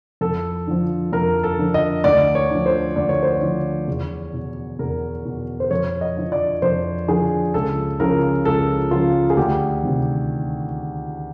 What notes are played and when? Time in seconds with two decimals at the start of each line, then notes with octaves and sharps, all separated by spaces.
0.21 F2 A4
0.67 D3 F3
1.13 F2 A#4
1.43 A4
1.59 D3 F3
1.74 D#5
2.04 D2 D5
2.35 C#5
2.50 D3 F3
2.66 C5
2.96 D2 D5
3.09 C#5
3.23 C5
3.35 C#5
3.41 D3 F3
3.88 E2
4.34 B2
4.79 E2 A#4
5.25 B2
5.60 C5
5.71 F2 C#5
6.01 D#5
6.17 D3 F3
6.32 D5
6.62 F2 C5
7.08 D3 F3 G#4
7.54 C#2 A4
8.00 C#3 F3 A#4
8.45 C#2 A4
8.91 C#3 F3 F4
9.30 G#4
9.37 D2 G4
9.83 C3 D#3